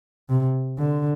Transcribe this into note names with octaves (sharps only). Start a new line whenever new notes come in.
C3
D3